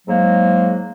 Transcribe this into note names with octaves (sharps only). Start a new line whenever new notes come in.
G#2 F#3 G#3 A#3